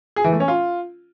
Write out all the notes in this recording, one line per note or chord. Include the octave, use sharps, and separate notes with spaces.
G#4
E3
A3
C#4
F4